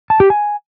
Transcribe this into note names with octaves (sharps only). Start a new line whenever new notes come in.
A5
G4
G#5